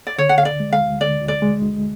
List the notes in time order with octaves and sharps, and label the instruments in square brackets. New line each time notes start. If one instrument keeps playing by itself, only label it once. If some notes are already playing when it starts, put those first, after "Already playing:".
[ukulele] D5
[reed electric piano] D3 [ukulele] C#5
[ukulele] F#5
[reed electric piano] D2 [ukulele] F5
[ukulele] D5
[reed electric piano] G#3
[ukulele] F5
[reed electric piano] D2
[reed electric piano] D3 [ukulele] D5
[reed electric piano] D2
[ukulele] D5
[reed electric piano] G#3
D2